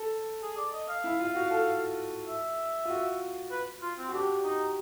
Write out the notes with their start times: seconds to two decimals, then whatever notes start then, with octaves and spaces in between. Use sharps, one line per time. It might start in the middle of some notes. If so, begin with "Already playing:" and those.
Already playing: A4
0.42 G#4
0.57 D5
0.73 D#5
0.89 F5
1.04 E4
1.19 F4
1.35 F#4
1.50 A4
2.28 E5
2.85 F4
2.90 F#4
3.51 B4
3.82 F4
3.98 C4
4.08 F#4
4.13 D4 G4
4.44 D#4